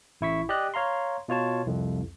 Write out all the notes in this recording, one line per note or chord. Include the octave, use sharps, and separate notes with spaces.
A1 E4 C#6 B6
G4 D5 D#5 F#6
C#5 F5 A#5 C6
B2 F4 C#5 A5
C2 F2